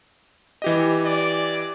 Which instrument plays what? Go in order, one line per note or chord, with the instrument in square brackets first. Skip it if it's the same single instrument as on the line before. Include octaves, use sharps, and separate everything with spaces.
[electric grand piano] E3 G4 D#5
[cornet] D5